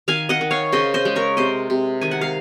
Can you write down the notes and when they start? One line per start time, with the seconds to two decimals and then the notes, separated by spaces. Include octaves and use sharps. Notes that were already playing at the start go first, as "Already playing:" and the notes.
0.08 D#3 F5 G#5
0.29 D#5 F#5
0.41 D#3
0.51 C#5 F5
0.72 C#3 C5 D#5
0.94 C5 D#5
1.05 G#3
1.16 A#4 C#5
1.37 C3 C5 D#5
1.70 C3
2.01 D#3 G#5
2.11 F#5
2.21 F5